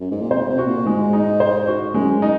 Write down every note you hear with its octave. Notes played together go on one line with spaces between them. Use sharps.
F#2
G#2
A#2
C3 C5
C3
F#4
A#2
G#2 G#3
D#4
C5
F#4
F#2 G#3
D#4